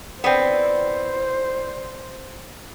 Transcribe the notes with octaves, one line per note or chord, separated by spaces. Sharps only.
D3 B3 C4 E4 C5